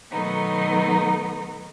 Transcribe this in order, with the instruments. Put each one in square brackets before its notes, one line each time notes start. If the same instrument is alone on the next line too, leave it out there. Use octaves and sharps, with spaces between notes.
[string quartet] B2 D#3 F#3 A3 B3 D#4